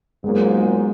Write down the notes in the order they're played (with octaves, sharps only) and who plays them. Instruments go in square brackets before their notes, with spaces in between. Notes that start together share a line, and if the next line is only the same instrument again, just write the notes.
[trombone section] G#2 F#3 A#3 F4 [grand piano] G#3 B3